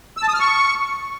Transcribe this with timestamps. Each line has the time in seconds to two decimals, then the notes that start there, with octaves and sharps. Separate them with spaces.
0.17 E6
0.23 A5
0.28 D#6
0.34 F6
0.40 C#6